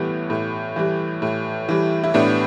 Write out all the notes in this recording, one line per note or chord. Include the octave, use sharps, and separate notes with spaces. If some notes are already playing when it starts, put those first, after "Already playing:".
Already playing: A2 E3 G3 B3
A2
E3 G3
A2
E3 G3
E4
A2 B3 D4